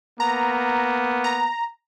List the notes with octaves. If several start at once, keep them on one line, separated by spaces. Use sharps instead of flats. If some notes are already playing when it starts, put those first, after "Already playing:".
A#3 B3 A#5
A#5